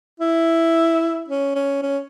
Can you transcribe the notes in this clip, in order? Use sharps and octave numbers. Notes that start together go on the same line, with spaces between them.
E4
C#4
C#4
C#4